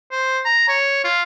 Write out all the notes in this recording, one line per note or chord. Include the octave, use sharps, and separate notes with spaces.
C5
A#5
C#5
F4